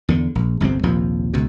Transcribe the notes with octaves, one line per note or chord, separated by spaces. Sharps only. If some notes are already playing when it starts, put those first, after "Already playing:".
E2 D3
A#1
G1 C2 F2 C4
A#1 D#2 C3 F3
C#2 B2